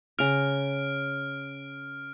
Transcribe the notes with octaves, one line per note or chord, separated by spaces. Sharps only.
C#3 A#5 F6 D7